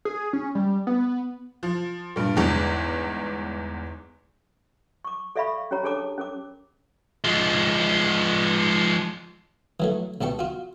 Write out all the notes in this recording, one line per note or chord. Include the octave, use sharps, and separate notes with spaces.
G#4
C#4
G3
B3
F3
G2 A#2
G1 E2 G#2
C#6 D6
A4 D5 E5 F5 B5 C#6
C#4 G4 C#5 A#5 B5
D4 G#4 A4 C#5 A5 D6
C#4 A#4 D6
F3 G#3
E3 F#3 A3
C#2 B2 G4 A5 C#6
F4 F#4